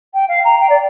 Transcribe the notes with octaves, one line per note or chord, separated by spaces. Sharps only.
G5
F5
A#5
G5
D5